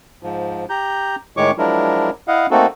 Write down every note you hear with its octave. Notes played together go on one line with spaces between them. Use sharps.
G#2 F3
G4 A#5 G6
A2 D#3 G#3 C#5 C#6 D6
F3 F#3 G#3 D4 E4 A#4
E4 D#5 F5 F#5
A3 A#3 C4 D#4 F#4 A4